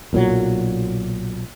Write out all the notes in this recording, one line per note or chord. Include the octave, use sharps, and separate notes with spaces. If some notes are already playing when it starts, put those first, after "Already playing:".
B1 A#2 C#3 F#3